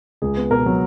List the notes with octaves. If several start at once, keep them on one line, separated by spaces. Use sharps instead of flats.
C#2 G#4
B3
B2 A#4
F#3